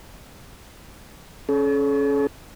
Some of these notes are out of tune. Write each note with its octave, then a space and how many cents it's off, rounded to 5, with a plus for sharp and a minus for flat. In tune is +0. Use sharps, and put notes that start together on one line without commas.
C#4 +0 A4 -45